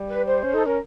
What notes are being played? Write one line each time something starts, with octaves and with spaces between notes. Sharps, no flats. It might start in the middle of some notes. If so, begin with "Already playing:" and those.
Already playing: G3
B4
C5
C#4
D#4 A4
C#4 A#4